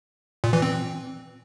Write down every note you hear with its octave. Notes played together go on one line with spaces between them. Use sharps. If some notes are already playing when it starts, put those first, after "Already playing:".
A#2
E3
C4